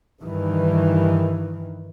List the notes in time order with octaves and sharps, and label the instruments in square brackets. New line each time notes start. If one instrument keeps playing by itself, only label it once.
[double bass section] G2 D#3 E3